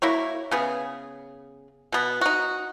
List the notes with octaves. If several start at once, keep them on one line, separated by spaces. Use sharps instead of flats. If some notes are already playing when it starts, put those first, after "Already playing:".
A#3 E4 F#4 C#5
C#3 B3 G#4
B2 B3
D#4 F#4